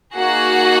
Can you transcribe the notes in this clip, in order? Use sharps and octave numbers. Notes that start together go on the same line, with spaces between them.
A#3 D#4 F#4 G#4 F#5